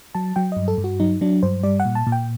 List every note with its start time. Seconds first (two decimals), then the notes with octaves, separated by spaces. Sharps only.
0.15 F#3 A5
0.36 F#3 G5
0.52 G2 D#5
0.68 A4
0.78 G2
0.84 F#4
1.00 F#3 D#4
1.21 F#3 D4
1.43 G2 C5
1.63 G3 D5
1.80 F#5
1.85 A#2
1.95 A5
2.07 A#2
2.12 G5